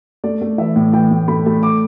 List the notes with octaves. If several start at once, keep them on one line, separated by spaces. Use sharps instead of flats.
A3 D5
A3
E3 E5
A2
E3 G5
A2
A3 B5
A3
D6